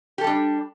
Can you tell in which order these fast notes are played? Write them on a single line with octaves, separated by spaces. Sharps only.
G4 A4 G3 D4